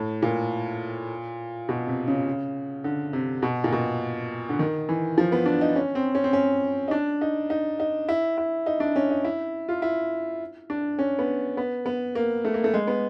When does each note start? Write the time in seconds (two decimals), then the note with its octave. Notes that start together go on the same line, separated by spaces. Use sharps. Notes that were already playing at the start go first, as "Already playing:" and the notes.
Already playing: A2
0.23 A#2
1.69 B2
1.87 C3
2.07 C#3
2.84 D3
3.13 C3
3.43 B2
3.64 A#2
3.72 B2
4.49 D3
4.59 D#3
4.89 E3
5.18 F3
5.32 B3
5.46 D4
5.61 D#4
5.75 C#4
5.95 C4
6.15 C#4
6.24 C4
6.33 C#4
6.88 D#4
6.91 D4
7.21 D#4
7.50 D#4
7.80 D#4
8.08 E4
8.38 E4
8.66 D#4
8.80 D4
8.96 C#4
9.10 D#4
9.25 E4
9.69 F4
9.82 E4
10.70 D4
10.99 C#4
11.19 B3
11.57 B3
11.86 B3
12.15 A#3
12.45 A3
12.54 A#3
12.64 A3
12.74 G#3
12.87 B3